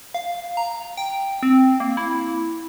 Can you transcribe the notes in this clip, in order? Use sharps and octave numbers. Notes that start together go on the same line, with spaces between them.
F5
A#5
G5
C4
A#3
E4